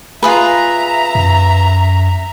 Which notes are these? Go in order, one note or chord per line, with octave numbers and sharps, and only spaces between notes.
F4 G#4 B4 E5 A#5
F#2